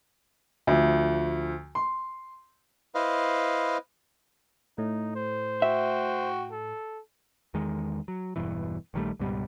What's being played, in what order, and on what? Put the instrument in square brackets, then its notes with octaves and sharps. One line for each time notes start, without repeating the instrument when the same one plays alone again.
[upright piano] D2 F3
C6
[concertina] E4 B4 C5 D#5 F5
[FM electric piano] A2 [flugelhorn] D#4
[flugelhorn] C5
[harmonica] F#4 G5 [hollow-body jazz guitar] E5
[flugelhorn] A4
[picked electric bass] E2 D#3 G#3
F#3
E1 G2 B2 E3
A#1 D#3 G3 A3
C#2 G#2 B2 G3